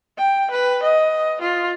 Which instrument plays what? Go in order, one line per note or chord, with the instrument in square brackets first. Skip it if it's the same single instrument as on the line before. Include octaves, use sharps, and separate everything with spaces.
[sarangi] G5
B4
D#5
F4